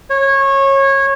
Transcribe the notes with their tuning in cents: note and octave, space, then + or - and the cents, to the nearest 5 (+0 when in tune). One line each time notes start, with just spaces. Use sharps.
C#5 -20